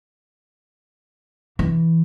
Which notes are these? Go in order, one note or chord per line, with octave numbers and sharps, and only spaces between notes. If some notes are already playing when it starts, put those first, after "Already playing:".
E3